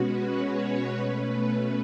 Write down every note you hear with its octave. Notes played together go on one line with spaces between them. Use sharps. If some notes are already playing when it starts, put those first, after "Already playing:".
Already playing: B2 G#3 C#4 F#4 B4
C#5
C#5
B2 A3 C#4 B4